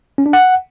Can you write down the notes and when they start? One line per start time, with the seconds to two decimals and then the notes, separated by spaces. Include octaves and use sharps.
0.18 C#4
0.26 D4
0.33 F#5